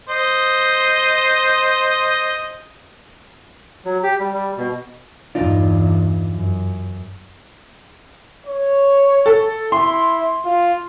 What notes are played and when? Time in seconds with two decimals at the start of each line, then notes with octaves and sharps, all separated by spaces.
0.10 C5 D#5
3.85 F#3
4.03 G4
4.19 G3
4.33 G3
4.58 B2
5.35 E2 G2 D#4 F4 D5
6.32 F#2
8.47 C#5
9.26 A4
9.72 E4 C6
10.45 F4